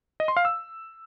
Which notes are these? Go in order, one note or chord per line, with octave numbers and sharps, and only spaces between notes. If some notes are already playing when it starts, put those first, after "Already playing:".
D#5
C6
F5
E6